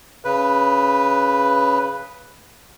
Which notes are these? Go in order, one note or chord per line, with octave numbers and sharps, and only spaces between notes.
C#3 B4